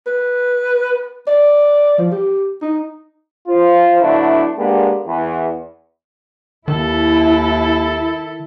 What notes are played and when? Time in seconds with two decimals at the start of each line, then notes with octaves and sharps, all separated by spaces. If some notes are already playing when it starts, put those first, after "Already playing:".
0.07 B4
1.27 D5
1.98 F3
2.12 G4
2.62 D#4
3.48 F4 C5
4.01 D3 F#3 A3 B3 D4 E4
4.58 G#3 A#3 B3 D4 G4
5.06 E2
6.68 D#2 D#3 E4 A4